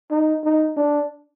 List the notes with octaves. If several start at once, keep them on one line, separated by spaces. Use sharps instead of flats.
D#4
D#4
D4